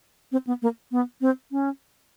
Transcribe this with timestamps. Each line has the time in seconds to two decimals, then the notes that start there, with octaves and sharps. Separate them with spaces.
0.32 C4
0.47 B3
0.62 A#3
0.92 B3
1.21 C4
1.51 C#4